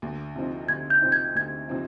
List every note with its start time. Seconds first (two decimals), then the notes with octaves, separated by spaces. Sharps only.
0.02 D2
0.36 C3 F3 C4 D#4
0.69 D2 G#6
0.90 G6
1.02 C3 F3 C4 D#4
1.12 G#6
1.35 D2 G#6
1.68 C3 F3 C4 D#4